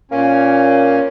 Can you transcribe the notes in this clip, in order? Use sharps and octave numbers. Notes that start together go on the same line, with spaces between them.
A#2 A#3 C#4